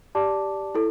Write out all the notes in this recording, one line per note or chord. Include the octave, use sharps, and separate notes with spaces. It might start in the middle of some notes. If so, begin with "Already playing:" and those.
G4 D5 A5 D6
E4 A4